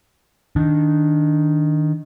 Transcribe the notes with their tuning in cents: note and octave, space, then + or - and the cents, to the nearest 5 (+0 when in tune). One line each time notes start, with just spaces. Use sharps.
D#3 +0 D4 +0